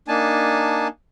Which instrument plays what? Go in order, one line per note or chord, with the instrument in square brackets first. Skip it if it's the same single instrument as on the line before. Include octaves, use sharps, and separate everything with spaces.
[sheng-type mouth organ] A#3 D4 D#4 G#5 A5